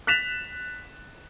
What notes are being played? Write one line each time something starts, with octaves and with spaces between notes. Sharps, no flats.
F#6 A6 B6 E7 F7